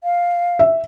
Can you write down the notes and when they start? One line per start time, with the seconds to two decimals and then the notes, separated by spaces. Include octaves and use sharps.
0.04 F5
0.59 E5